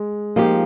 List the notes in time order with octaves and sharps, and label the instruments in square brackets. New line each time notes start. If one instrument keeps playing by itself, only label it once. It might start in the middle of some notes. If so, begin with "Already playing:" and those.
Already playing: [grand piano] G#3
[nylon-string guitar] F3 A#3 D#4 G4